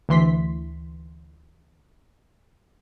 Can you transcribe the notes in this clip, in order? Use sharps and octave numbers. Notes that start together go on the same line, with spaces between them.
D2 E3 C6 B6